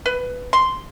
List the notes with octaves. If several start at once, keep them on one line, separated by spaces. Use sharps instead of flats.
B4
C6